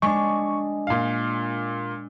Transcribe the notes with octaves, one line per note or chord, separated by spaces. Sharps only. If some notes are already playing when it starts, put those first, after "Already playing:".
G#3 D4 C#6
A#2 F5